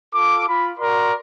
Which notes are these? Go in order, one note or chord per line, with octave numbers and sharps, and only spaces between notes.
F4 A4 D6
F4 B5
F#4 A#4 D5 C6